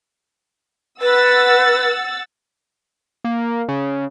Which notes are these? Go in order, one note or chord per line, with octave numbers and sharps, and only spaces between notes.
B4 F#5 E6 A6
A#3
C#3